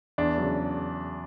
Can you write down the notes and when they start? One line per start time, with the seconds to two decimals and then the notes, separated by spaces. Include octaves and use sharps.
0.18 E2 D4
0.38 C#3 F#3